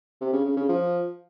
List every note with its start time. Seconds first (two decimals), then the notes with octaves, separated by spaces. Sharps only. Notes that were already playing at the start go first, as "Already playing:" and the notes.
0.21 C3
0.33 C#3
0.45 C#3
0.57 C#3
0.69 F3